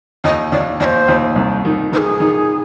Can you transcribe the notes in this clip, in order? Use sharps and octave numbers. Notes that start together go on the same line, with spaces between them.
D#2 D#5
D#2 D5
D#2 C5 D5
D#2
C2
D#3
D#3 G#4 C5
D#3